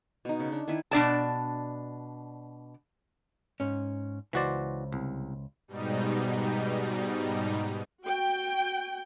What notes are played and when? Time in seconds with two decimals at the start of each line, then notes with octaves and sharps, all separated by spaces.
0.25 B2 D#4
0.40 C#3
0.52 D4
0.68 D#3 E4 B4
0.91 B2 D4 D5 A5
3.60 G#2 C#4
4.33 C#2 E3 F#4 C5 D5
4.93 C2
5.68 G#2 B2 G3 D#4
8.05 F#4 G5